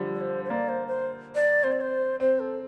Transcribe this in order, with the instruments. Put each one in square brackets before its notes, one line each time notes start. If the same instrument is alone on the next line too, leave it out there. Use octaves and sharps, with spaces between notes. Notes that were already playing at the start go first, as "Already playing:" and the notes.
Already playing: [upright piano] D3 F3 G3
[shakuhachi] D5
C5
C5
[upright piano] A#3 [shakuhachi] D5
[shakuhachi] C5
C5
D5
[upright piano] C4 [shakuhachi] C5
[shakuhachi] D5
C5
[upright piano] C4 [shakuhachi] C5
[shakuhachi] A4